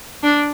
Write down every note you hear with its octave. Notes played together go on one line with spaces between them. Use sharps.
D4